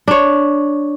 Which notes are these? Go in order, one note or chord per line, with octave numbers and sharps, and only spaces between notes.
D4 C#5